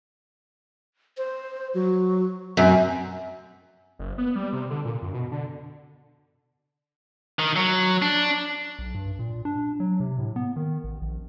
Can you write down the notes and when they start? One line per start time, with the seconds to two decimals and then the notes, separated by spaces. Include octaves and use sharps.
1.17 C5
1.74 F#3
2.57 F#2 C4
3.99 F#1
4.18 B3
4.36 G3
4.53 C3
4.70 D3
4.85 A#2
5.02 F#2
5.13 B2
5.31 D3
7.39 D#3
7.56 F#3
8.02 D4
8.79 B1
8.95 G2
9.19 A#2
9.45 D4
9.80 F#3
10.00 C3
10.19 A2
10.36 B3
10.56 D#3
10.84 A1
11.02 A#1